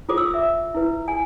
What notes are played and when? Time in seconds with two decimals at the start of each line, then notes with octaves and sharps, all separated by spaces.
0.09 F4 A4 C5 D6
0.17 E6
0.34 E5
0.74 E4 B4
1.08 G#5